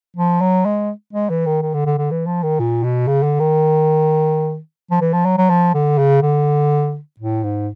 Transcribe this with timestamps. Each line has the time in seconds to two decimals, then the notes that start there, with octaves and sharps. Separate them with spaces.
0.16 F3
0.41 F#3
0.65 G#3
1.13 G#3
1.30 E3
1.46 D#3
1.62 D#3
1.74 D3
1.86 D3
1.98 D3
2.11 E3
2.26 F3
2.43 D#3
2.59 A#2
2.83 B2
3.07 C#3
3.23 D3
3.40 D#3
4.91 F3
5.01 E3
5.13 F3
5.25 F#3
5.38 F#3
5.50 F3
5.74 D3
5.98 C#3
6.22 D3
7.20 A2
7.44 G#2